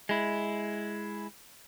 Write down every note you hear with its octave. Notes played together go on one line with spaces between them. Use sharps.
G#3 E4